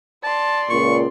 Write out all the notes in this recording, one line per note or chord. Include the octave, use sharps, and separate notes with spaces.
D5 A5 C6
C#2 A#2 C#6